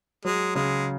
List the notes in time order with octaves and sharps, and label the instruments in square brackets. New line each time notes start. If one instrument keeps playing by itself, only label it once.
[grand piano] F#3 [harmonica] G#3
[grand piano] C#3 [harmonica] G#3